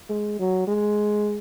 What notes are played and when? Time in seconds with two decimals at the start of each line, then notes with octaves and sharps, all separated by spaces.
0.09 G#3
0.39 F#3
0.68 G#3